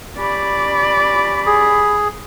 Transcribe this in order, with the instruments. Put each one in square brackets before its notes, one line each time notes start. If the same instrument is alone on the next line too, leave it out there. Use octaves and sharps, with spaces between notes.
[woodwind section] C#4 G4 B5 [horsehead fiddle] D5
[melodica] G#4